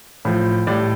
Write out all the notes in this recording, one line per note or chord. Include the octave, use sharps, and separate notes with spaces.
A2 F3
A2 G3 D5